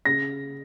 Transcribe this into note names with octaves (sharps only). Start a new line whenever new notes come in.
C#3 A#6